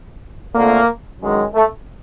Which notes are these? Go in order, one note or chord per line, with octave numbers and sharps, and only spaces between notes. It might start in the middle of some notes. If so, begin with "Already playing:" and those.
F2 D3 F3 A3 A#3
F#2 D#3 G#3
A3